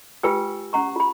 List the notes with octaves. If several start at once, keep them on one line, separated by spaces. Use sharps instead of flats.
F4 G4 B4 G5 G#5 E6
C#4 F#5 A#5 C#6
F4 B5